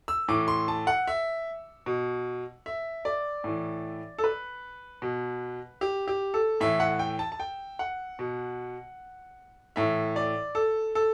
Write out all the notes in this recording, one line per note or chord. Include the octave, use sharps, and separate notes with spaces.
E6
A2 E3 D6
C6
A5
F#5
E5
B2
E5
D5
A2 E3
A4
B4
B2
G4
G4
A4
A2 E3 E5
F#5
G5
A5
A5
G5
F#5
B2
A2 E3 E5
D5
A4
A4